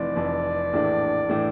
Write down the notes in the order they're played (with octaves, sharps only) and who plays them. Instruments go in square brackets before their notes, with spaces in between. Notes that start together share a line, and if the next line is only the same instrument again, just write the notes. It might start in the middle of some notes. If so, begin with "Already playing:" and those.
Already playing: [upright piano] F1 F2 E3 [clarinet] D5
[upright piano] F1 F2 E3
A#1 A2 E3 A3 D4
A2 E3 A3 D4